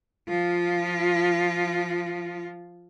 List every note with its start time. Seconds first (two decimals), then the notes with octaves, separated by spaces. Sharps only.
0.28 F3 F4